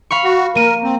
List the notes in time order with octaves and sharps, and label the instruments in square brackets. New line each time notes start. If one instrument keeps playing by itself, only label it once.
[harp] F5 B5 C#6
[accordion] F#4
[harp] A#3 D#7 [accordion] A#4
[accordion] C4